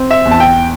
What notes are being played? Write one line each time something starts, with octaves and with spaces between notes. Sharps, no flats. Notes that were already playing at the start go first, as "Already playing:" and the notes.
Already playing: C4
E5
E2
A5
G5